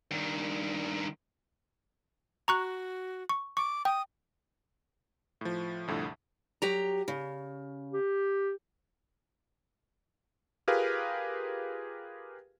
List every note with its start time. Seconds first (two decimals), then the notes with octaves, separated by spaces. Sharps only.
0.11 G2 D#3
2.48 F#4 A#5 C#6 F#6
3.29 C#6
3.57 C#6 D6
3.85 G5 D#6
5.41 A2 F3
5.88 C2 F2 A2 D3
6.62 F#3 G4 A#5
7.08 C#3
7.93 G4
10.68 F4 G4 G#4 A#4 B4 F5